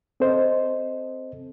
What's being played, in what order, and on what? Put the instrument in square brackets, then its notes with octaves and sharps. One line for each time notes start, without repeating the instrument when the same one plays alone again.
[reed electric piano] C4 A4 C5 D#5